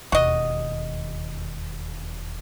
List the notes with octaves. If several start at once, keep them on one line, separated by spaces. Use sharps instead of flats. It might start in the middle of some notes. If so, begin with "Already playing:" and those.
E1 D#2 F#4 D#5